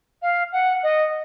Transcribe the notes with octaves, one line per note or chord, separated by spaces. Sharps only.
F5
F#5
D#5